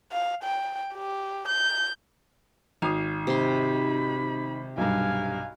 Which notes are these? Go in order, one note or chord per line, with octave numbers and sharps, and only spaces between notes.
F5
G5
G4
G6
G#1 F5 D#6
C3 D#4 B5 C6
B1 G2 F5 G#5